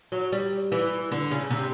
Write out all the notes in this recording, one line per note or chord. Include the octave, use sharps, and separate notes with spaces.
F#3
G3
E3
D3
C#3
C3